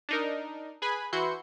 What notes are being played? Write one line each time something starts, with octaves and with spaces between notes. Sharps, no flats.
D4 D#4 A#4
G#4 B4 G#5 B5
E3 E4 F#4 C6 G6 C#7